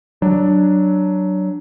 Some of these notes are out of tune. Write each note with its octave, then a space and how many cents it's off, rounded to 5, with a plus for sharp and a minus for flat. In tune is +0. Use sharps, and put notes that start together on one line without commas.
F#3 +15 D4 +10